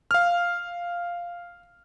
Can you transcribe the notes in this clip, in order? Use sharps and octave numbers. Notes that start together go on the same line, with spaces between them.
F5 F6